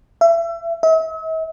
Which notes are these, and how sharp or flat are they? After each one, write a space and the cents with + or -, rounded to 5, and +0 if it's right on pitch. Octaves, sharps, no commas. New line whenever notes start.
E5 +30
E5 -45